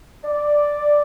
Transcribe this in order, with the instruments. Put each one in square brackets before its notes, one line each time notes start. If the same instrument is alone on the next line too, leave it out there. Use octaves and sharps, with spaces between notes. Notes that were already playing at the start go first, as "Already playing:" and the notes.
[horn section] D5